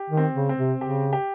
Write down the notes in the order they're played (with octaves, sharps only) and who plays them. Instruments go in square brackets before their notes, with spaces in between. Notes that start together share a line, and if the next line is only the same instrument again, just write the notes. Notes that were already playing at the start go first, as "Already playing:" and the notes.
Already playing: [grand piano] G4
[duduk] D#3
[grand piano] C4
[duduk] C#3
[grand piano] C4
[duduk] C3
[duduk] C#3 [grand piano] G4
[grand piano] G4